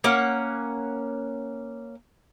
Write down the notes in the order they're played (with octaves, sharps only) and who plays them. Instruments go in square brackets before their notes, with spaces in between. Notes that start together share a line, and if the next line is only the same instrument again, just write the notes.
[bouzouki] A#3 C#4 F#5